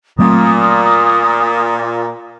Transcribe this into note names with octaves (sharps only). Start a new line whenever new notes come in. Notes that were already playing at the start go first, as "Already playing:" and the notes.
A#2 F#3 A3 C4 D#6